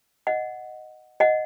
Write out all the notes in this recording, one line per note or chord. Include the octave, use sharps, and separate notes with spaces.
D#5 F#5
D#5 F#5